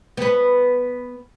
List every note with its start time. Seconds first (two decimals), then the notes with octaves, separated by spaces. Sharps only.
0.17 B3 B4